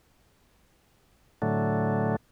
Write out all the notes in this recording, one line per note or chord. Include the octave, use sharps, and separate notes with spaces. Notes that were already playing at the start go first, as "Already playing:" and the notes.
A2 D3 F#3 A3